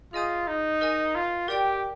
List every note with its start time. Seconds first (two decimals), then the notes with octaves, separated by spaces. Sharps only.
0.13 F4 G#4 D#5 G#5 D#6 G6
0.48 D#4
0.81 A#4 D#5 G#5
1.15 F4
1.48 G4 A#4 D5 G5